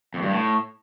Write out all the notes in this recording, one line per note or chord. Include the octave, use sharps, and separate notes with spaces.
F2
G2
A2